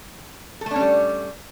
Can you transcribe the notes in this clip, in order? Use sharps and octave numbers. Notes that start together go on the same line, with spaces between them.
G3 A3 C#4 D4 A4